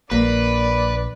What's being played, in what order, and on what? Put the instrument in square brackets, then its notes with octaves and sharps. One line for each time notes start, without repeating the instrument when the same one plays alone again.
[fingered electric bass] A#1 [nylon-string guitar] A#3 [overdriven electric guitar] B4 [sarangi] D5